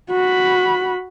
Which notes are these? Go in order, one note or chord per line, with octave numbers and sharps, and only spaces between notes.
F#4 B5